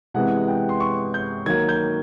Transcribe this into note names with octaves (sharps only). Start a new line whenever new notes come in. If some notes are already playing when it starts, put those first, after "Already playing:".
C3 E3 G#3 B3 F#5
G5
C6
C#6
G6
D#3 F#3 A#3 G#6
G6